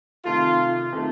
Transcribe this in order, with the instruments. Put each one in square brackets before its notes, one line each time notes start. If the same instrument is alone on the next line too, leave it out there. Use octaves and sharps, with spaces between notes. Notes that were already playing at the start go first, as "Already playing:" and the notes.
[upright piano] C3 D#3 A3 [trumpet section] F4
[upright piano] C3 D#3 A3